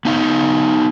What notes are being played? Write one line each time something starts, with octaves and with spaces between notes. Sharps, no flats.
B3 D#4 F5